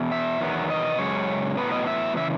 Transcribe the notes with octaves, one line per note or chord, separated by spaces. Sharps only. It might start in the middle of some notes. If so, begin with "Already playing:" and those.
Already playing: E2 B2
E5
E2 D#3 F#3 B3
D#5
F#2 C#3 G#3 C#5
A2 F#3 B3 B4
D#5
E5
C#3 E3 E5